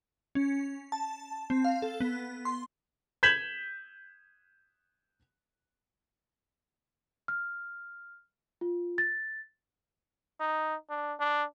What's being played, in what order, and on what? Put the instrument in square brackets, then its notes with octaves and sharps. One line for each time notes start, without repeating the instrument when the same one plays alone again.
[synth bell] C#4
A5
C4
F5
A4
B3
C6
[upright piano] G6 G#6 B6 E7 F#7
[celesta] F6
F4
A6
[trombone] D#4
D4
D4